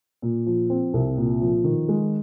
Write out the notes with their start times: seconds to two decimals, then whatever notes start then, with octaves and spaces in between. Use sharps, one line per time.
0.22 A#2
0.46 F3
0.70 C4
0.94 C2
1.17 A#2
1.41 F3
1.64 D#3
1.89 G#3